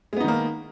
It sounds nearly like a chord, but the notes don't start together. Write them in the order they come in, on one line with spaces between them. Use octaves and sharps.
G#3 B3 D#4 D#3 A#3